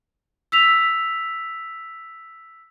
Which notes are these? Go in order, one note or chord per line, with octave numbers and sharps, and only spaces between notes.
E6 B6 F7